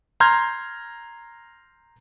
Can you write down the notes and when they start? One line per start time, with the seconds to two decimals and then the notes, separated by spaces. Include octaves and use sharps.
0.20 A#5 C6 F6 G6 G#6